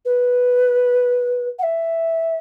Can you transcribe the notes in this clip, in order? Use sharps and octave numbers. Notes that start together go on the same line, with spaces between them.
B4
F#5
E5